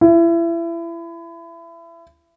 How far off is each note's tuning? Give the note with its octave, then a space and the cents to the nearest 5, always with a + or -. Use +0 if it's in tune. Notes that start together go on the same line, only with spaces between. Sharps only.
E4 +30